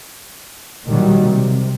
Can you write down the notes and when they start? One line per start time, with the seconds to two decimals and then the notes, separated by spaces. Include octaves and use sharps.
0.87 A#2 D#3 F#3 G3
1.24 C3